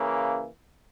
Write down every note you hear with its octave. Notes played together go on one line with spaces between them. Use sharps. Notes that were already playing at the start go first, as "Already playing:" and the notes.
Already playing: C#3 E3 A#3